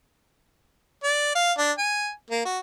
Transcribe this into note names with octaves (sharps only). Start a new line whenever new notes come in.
D5
F5
D4
G#5
A#3
F#4